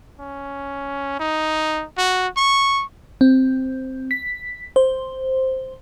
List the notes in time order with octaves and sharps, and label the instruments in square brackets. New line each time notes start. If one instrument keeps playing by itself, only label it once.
[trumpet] C#4
D#4
F#4
C#6
[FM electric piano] C4
B6
C5